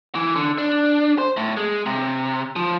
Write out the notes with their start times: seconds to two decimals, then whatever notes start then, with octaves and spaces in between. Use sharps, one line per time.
0.15 E3
0.36 D3
0.58 D4
1.18 C5
1.37 A2
1.57 G#3
1.86 C3
2.56 F3